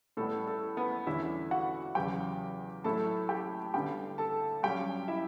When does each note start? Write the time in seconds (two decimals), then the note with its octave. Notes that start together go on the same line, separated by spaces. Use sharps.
0.17 A2 G3 B3 A4
0.47 A4
0.77 B3 B4
1.06 E2 D3 G3 C#4 E4 E5
1.51 F#4 F#5
1.95 E2 C#3 F#3 G4 G5
2.84 A2 F#3 A3 E4 A4 A5
3.29 G4 G5
3.74 G2 D3 G3 B3 G4 G5
4.18 A4 A5
4.63 G2 F#3 C#4 G4 G5
5.08 E4 E5